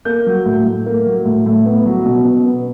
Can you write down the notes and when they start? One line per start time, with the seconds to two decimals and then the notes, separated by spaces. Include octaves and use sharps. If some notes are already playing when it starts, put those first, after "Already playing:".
0.05 A#3 G6
0.26 F#3
0.46 A2
0.65 A2
0.86 A#3
1.06 F#3
1.25 A2
1.46 A2
1.66 B3
1.86 F#3
2.06 B2
2.25 B2
2.46 B3